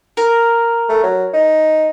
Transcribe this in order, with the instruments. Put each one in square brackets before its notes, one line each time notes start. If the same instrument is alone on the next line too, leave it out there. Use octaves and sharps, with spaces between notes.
[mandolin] A#4
[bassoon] A3
F#3
D#4